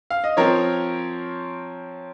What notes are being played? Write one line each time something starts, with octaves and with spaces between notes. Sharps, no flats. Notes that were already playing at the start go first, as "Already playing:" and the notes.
F5
D#5
F3 C4 A#4 C#5